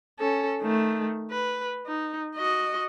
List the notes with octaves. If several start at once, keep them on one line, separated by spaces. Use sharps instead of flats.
C#4 A4
D#3 A3
B4
D#4
F#4 D#5